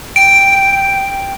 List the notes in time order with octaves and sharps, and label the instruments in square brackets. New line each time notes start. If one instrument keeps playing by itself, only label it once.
[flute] G5 [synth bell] D7